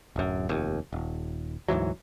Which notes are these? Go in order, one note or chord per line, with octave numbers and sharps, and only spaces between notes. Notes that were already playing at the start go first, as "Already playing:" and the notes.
D1 F#2
F1 D#2
D#1
D2 G#2 E3 F#3